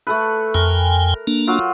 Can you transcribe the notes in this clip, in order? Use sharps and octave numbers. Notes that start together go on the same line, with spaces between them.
A3 A4 B4
F2 A#4 G5 G#5
A#3 D4
F#3 F4